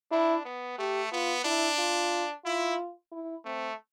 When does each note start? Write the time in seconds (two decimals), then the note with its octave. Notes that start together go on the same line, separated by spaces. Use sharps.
0.11 D4 E4
0.45 B3
0.78 A3 G4
1.12 B3 F4
1.45 D4 E4
1.78 F4
2.45 E4 F4
3.12 E4
3.45 A3 C4